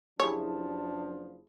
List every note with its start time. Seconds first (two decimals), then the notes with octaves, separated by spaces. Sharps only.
0.20 F#1 F3 D4 E4 G4 G#4 C#5 A5